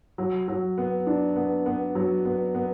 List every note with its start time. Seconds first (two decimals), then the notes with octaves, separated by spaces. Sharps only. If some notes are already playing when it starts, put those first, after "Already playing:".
0.18 F#3
0.48 F#3
0.78 B3
1.07 D4
1.36 B3
1.66 B3
1.95 F#3
2.25 B3
2.55 B3